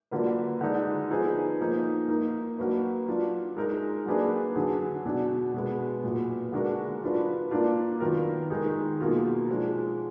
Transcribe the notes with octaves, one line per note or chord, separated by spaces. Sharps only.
D3 F#3 A#3 F4 B4
D3 G#3 D#4
F3 B3 D#4 G#4 B4
F3 A#3 D#4 A#4
A#3 D#4 A#4
F#3 A#3 D4 F#4 B4
F#3 D4 F4
G#3 D#4 A#4
F#3 A#3 D4 G#4 B4
D3 F#3 D4 G#4
B2 F#3 D4
B2 G#3 B3
A#2 F#3 B3
D3 G#3 D4 F#4 A#4
F#3 D4 F4 B4
A#3 D4 F4
D#3 F#3 B3 F4 A#4
D#3 G#3 D#4 G#4
B2 F#3 A#3 F4 G#4
F3 G#3 D4 F#4